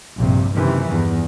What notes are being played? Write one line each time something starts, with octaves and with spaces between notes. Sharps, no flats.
A#1 G2 C3
F#1 C3 D#3 E3
E2 G2